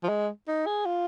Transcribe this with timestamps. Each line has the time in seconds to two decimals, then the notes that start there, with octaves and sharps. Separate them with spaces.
0.03 F3
0.09 G#3
0.48 D#4
0.67 G#4
0.86 F4